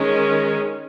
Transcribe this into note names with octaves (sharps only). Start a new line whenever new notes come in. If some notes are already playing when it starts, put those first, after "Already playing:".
Already playing: D#3 G#3 C#4